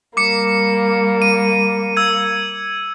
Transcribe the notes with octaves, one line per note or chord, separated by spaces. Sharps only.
G3 A#3 D6 C#7
D#7
E6 G#6